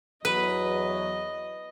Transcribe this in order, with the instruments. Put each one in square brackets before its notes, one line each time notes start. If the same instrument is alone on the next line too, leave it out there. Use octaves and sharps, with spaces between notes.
[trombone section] E2 F#3 [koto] B4 [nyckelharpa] D#5